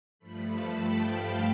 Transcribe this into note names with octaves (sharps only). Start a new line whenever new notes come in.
G2 F3 A3 B5
A5
G5
F5